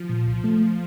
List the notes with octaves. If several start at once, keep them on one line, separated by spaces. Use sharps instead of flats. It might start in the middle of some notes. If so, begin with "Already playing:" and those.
Already playing: F3
A#2
C2
A3